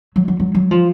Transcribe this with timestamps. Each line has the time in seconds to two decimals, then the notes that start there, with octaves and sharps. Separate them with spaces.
0.16 F#3
0.28 F#3
0.40 F#3
0.55 F#3
0.71 F3